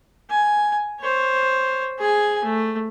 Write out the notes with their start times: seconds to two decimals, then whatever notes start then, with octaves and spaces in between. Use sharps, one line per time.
0.30 G#5
1.00 C5 C#5
1.99 G#4 G#5
2.44 A3